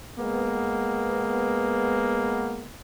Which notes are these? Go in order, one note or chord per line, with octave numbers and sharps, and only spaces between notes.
G#3 A#3 B3